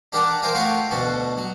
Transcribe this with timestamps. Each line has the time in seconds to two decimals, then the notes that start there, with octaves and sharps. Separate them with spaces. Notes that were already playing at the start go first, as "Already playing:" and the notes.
0.12 D4 G4 A#4 D5 F#5 A5
0.42 A#4 C5 F5 G5 G#5
0.54 A3 F4 F#4 C#5 F5 G5
0.91 D2 B2 F#4 A5
1.37 F#3